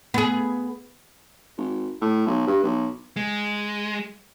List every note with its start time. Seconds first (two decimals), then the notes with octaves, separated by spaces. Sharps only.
0.14 B3 G#4
1.57 G#1
2.01 A2
2.27 B1
2.47 G2
2.63 B1
3.16 G#3